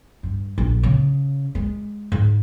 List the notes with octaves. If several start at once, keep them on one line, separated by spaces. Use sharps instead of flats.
G2
A#1
C#3
G#3
G#2